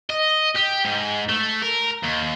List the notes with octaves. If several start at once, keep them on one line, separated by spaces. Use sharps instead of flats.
D#5
G4
G#2
A3
A#4
D#2